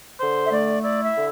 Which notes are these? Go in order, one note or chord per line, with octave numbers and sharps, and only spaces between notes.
D3 C5
E5
A3 D5
E4 D5
E5
D3